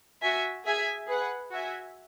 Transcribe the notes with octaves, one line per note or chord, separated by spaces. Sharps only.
F#4 E5 G#5
G#4 E5 G#5
G#4 B4 F#5
F#4 E5 G#5